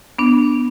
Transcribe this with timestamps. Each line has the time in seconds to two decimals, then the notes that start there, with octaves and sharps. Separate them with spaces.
0.19 B3 D4